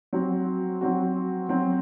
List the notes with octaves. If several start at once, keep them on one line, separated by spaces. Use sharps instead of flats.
F#3 C4 F#4
F#3 C4 F#4
F#3 C4 F#4